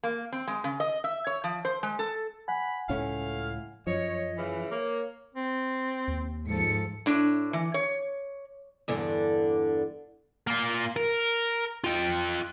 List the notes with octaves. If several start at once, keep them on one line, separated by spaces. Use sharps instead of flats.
A#3
C4
G#3
C#3
D#5
E5
C#5
F3
C5
G#3
A4
F#5 G#5 B5
C#2 A2 A3 C#4 E4 F5
F#2 F3 C#5 D#5
C#3 E3
A#3 C#5
C4
D#2
G#2 F3 A4 C#7
A2 D4
E3
C#5
E2 G2 D3
A#3 F4
A#4
F4 G5